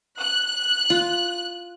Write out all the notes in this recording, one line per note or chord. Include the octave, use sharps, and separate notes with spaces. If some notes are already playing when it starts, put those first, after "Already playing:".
F#6
F4